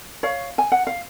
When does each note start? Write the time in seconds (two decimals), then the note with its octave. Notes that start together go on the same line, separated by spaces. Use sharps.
0.23 C#5 F5
0.58 G#5
0.72 F#5
0.87 F5